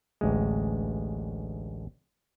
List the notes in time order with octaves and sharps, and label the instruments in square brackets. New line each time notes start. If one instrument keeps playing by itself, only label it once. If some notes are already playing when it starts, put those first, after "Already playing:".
[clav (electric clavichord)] A1 D2 G#3